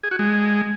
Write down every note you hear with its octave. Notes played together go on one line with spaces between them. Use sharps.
G#4
F#4
G#3